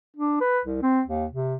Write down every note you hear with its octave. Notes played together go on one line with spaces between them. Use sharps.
D4
B4
C2
C4
D#2
C3